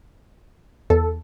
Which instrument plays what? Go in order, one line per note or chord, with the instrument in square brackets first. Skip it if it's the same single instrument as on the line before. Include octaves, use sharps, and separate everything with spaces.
[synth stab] E2 [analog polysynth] A4